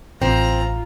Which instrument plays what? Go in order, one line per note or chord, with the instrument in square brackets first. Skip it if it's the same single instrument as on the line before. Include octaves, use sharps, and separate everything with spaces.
[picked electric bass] A1 [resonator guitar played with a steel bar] C4 [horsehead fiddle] F4 [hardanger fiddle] A#5